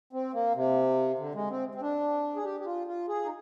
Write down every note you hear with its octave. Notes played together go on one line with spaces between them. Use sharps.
C4
A#3
C3
D3
G#3
C4
C4
D4
G#4
G4
G4
F4
F4
G#4
D#4